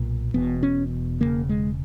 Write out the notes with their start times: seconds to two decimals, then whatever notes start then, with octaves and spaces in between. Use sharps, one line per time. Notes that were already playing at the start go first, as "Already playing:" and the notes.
Already playing: B1 A#2
0.34 E1 E2 B2 B3
0.63 C#4
1.20 E1 E2 C#3 A#3
1.49 G#3